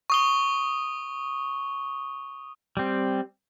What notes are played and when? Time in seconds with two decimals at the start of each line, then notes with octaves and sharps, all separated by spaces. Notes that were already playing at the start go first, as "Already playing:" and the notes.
0.10 C#6 D#6 G7
2.77 G3 C4